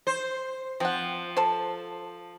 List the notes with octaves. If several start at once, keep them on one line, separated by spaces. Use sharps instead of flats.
C5
F3 C4 F#5
A4 C5